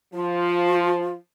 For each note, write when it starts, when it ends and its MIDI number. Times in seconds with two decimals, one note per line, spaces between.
0.13 1.11 53
0.13 1.13 65